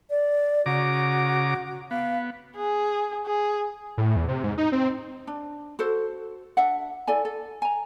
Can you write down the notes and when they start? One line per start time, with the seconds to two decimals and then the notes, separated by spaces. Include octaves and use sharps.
0.10 D5
0.66 C#3 F#4 A#5 D6
1.91 B3 F5
2.56 G#4
3.26 G#4
3.98 A2
4.16 E2
4.28 C3
4.44 G#2
4.58 D#4
4.72 C4
5.27 D4
5.79 F#4 A4 C5
6.57 D4 E5 F#5
7.07 E4 A4 D5 G#5
7.25 A4
7.62 G#5 A#5